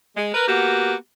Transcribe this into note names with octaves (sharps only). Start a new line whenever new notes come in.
G#3
A#4 B4
A#3 B3 F#4 G4